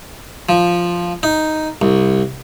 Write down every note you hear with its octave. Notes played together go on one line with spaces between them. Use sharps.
F3
D#4
C2